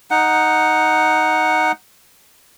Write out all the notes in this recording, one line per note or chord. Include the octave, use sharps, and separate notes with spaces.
D#4 F#5